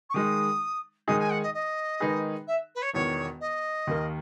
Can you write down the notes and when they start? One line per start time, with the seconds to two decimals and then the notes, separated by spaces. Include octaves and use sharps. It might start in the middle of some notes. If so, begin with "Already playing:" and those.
0.10 C#6
0.14 D#3 G#3 D#4 D#6
1.08 D#3 G#3 D#4 G#4 D#6
1.19 G#5
1.30 F#5
1.43 D#5
1.54 D#5
2.00 D#3 G#3 D#4 G#4 B4
2.47 E5
2.75 B4
2.82 C#5
2.94 E1 E2 D#3 C#5
3.41 D#5
3.87 D#2 D#3 A#3